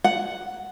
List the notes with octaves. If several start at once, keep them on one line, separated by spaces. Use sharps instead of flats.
F#5